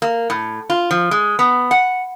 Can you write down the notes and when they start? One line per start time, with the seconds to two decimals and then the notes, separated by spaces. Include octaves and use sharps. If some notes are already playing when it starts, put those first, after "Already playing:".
0.02 A#3
0.30 A2
0.70 F4
0.91 F3
1.11 G#3
1.39 B3
1.71 F#5